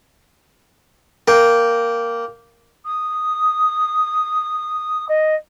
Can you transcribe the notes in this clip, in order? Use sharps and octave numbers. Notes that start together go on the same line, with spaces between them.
A#3 G5
D#6
D#5